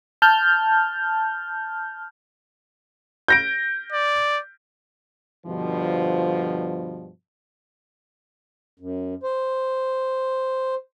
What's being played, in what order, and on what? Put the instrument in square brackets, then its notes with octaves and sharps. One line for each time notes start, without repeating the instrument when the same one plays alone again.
[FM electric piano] A5 F6 G6
[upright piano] G6 A#6 D7
[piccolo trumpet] D5
[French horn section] G2 B2 D3 F3
[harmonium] F#2
C5